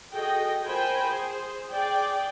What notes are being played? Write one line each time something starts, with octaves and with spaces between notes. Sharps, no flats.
F#4 G#4 A4 D#5 G5
F4 A#4 C5 G5 G#5 B5
G#4 C5
G#4 D5 G5